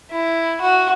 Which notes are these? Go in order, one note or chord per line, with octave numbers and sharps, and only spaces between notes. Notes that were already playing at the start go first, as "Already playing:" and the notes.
E4
F#4